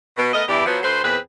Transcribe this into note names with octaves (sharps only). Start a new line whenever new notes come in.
B2
A3 B3 A#4 D#5
E2 G2 D4 E4 G4 D5
F3 F#3 B3
D2 A3 B4 C5
E2 A#2 C4 G#4 B4